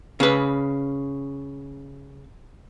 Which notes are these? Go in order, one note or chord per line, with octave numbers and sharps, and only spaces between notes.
C#3 B4